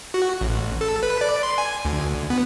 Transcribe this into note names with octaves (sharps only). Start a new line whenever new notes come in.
F#4
A1
A4
B4
D5
C6
G#5
D2
B3